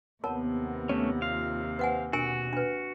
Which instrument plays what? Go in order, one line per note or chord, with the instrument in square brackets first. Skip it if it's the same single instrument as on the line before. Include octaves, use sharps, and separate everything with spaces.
[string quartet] D#2 C3 [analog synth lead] B3 [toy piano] A#4 C#5 A5
[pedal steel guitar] A3 C#4 [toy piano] C#5
[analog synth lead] F4 [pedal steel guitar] F5
[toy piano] B4 F#5 G#5 [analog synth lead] C5
[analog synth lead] B2 [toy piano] D4 A#4 G#5 [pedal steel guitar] F#4
[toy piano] D4 B4